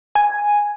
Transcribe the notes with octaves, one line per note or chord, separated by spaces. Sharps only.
G#5